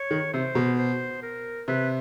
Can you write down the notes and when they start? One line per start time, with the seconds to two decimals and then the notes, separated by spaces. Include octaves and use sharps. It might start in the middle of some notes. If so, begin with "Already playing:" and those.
Already playing: C#5
0.11 D#3
0.33 C3 C5
0.55 B2
0.78 C5
1.23 A#4
1.68 C3 B4